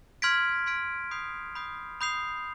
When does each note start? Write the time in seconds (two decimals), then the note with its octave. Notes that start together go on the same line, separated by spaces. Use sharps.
0.22 C6 F6 G#6 B6 D7
0.66 C6 F6 G#6 B6 D7
1.11 B5 D#6 G6 C7 F7
1.55 B5 D#6 G6 C7 F7
2.01 B5 D#6 G6 C7 F7